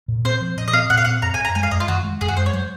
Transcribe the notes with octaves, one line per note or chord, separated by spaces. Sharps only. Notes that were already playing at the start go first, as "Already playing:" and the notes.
A#2
C4 C5
F3
A#2 D#5
D#5
C4 F5
A#2 F#5
F5
C4 F#5
F#2 A#5
G#5
F#2
A#5
G#3 G#5
F5
F#2 D#5
F4
D#3 F#4
G#3
F#2 G#4
F#4
G#3 C5
C#5
F#3 C5